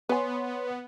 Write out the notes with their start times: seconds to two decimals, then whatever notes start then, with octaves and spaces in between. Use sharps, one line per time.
0.09 B3 B4 C#5 G#5 C6